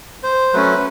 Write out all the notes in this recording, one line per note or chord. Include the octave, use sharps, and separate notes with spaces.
C5
F#3 A3 C#4 B4